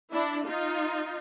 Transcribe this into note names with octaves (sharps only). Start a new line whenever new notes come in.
D4 E4
D#4 F4